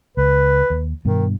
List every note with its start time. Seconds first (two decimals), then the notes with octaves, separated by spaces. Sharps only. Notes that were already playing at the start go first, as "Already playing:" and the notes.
0.17 C#2 B4
0.70 D#2
1.05 G2 B2 D#3